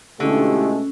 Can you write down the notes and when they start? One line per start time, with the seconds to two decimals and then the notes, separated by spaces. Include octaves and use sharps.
0.20 B2 D3 G#3 A3 C#4 E4 F4 G4